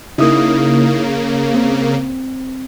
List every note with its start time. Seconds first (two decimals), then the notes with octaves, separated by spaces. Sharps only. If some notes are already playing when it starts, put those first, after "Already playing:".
0.18 C#3 A#3 D#4 E4 D#6
1.55 C4